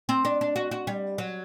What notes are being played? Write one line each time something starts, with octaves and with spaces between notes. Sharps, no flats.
C4
D4
D4
F#4
F#4
G3
F#3